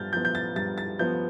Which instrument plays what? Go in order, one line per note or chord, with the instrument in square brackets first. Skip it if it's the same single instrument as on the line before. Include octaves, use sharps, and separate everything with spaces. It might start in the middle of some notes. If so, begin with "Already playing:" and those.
Already playing: [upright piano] G2 F3 B3 F6 G6 A6
F3 B3 G6
G6
A6
G2 A6
A6
F3 B3 G6